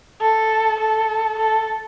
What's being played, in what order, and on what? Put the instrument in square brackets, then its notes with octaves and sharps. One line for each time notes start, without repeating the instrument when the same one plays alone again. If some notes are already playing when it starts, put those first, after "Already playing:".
[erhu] A4
A4
A4